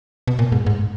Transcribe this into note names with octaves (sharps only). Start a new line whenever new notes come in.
B2
A#2
G#2
G#2